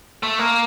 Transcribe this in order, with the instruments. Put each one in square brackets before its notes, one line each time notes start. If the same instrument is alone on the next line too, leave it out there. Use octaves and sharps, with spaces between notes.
[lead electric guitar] A3
A#3